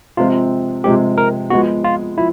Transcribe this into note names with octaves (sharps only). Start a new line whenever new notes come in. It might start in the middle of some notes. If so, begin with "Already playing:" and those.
C3 F3 G#3 C4 F4
C3 F3 G#3 C4 G4
A#4
F3 G#3 B3 F#4
F4
F3 E4